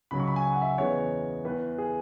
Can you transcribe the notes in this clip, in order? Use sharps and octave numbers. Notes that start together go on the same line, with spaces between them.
C#2 C#3 F#3 B5
C#6
B5
G#5
F#5
E5
E2 C#3 G#3 B3 C#5
E2 E3 B3 B4
G#4